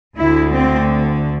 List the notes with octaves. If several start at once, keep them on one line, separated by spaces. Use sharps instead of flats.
D2 D3 E4
C4